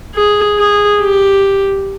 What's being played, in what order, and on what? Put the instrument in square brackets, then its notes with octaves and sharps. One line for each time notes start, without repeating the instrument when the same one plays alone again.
[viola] G#4
G#4
G4